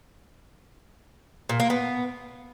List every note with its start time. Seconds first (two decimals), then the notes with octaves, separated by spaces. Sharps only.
1.49 A#2
1.60 A#3
1.70 B3